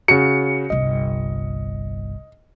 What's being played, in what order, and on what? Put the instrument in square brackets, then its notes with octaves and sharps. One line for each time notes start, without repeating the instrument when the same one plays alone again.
[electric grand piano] C#3 F#4 [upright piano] C#7
[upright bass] G1 C2 [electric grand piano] D#5